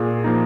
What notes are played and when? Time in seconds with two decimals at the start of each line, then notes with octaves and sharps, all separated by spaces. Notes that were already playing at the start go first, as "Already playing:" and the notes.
Already playing: A#2 G#4
0.24 F3 A#3 D#4